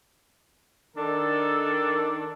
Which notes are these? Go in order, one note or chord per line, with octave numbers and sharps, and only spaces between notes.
D#3 D4 A4